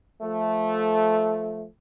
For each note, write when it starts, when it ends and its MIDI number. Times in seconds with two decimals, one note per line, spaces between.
0.22 1.66 53
0.22 1.66 57